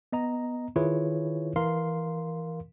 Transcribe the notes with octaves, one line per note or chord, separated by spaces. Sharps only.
B3 D#5 A#5
D#3 E4 F4 G#4 B4 C#5
E3 A#4 F5 C6